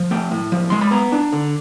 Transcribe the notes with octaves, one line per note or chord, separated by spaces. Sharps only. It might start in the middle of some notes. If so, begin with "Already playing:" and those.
Already playing: F3
A3 G5
A2
F3
G#3 C6
B5
B3 A#5
D4
D3